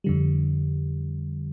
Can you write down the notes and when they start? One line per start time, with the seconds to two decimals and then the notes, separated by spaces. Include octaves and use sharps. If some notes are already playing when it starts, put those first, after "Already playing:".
0.04 F2 D3 G3